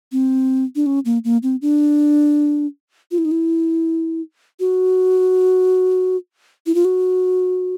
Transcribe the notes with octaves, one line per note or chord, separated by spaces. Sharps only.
C4
D4
C#4
A#3
A#3
C4
D4
F4
E4
D#4
E4
F#4
E4
F4
F#4